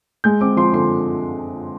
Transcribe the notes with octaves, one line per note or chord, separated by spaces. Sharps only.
G#3 G6
C4 D6
F3 C6
D3 C6